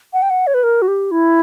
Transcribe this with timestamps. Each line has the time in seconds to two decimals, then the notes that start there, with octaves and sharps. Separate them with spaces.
0.13 F#5
0.22 G5
0.30 F#5
0.47 C#5
0.54 B4
0.63 A#4
0.82 F#4
0.88 G4
1.11 E4